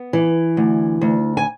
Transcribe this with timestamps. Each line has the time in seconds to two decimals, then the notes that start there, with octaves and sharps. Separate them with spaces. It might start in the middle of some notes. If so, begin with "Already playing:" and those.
Already playing: B3
0.13 E3
0.57 D2
1.01 D2
1.37 G#5